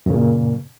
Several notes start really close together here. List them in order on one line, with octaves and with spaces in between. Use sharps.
F#2 C#3 A#2